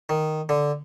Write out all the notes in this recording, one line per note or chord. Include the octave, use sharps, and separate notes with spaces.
D#3
D3